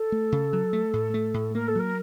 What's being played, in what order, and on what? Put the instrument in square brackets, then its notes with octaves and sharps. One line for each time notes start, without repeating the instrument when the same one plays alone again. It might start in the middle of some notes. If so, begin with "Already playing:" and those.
Already playing: [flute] A4
[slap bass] A3
C#3
F#3
A3
A2
A3
A2
[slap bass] A#3 [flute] A#4
[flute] A4
[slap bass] F#3 [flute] A#4